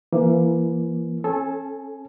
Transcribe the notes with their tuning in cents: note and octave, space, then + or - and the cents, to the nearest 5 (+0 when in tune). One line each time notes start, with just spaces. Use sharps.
E3 +35 A#3 +20
C#4 -35 A4 -15 G#5 +0